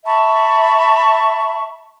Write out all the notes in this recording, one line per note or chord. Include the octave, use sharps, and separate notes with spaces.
E5 A5 B5 C#6